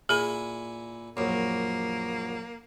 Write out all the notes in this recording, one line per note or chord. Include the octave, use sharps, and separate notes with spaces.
A#2 E4 G#4 G#5
A#1 F#2 A#3